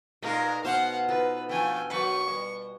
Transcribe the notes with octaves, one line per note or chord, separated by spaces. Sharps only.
A#2 G#3 A3 D#4 F4 A#4 B4
B2 C5 F5 F#5
D#4 F4 A4 B4
F3 A3 D4 F4 G5 G#5
F#3 A#3 B4 C#6
G3